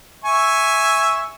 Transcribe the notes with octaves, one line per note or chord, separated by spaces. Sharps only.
E5 G#5 C#6